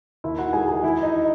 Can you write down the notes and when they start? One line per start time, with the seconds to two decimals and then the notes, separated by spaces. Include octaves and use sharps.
0.24 D#2 E4 E5
0.38 F#4 F#5
0.53 G#3 G#4 G#5
0.68 G#4 G#5
0.83 E3 E4 E5
1.03 D#4 D#5